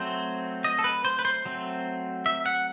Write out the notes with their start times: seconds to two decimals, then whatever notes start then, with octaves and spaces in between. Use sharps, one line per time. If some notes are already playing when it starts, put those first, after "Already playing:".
Already playing: F#3 A3 C4 C5
0.64 D#5
0.79 A4
0.84 B4
1.05 C5
1.19 B4
1.25 C5
1.45 F#3 A3 C4
2.26 E5
2.46 F#5